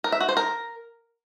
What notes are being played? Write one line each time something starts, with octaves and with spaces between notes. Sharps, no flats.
A#4
E5
F#4
C5
A#4